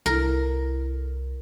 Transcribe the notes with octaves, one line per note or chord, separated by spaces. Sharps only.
C2 E4 A4 A#4